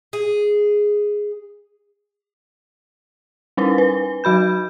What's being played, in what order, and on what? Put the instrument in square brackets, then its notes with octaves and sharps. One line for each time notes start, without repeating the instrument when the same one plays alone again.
[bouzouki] G#4
[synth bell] G3 C#4 D#4 B4
B4
F#3 F#4 B5 G6